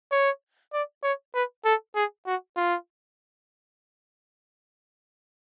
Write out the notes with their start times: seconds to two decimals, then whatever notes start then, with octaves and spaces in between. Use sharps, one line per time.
0.12 C#5
0.73 D5
1.03 C#5
1.34 B4
1.65 A4
1.95 G#4
2.26 F#4
2.56 F4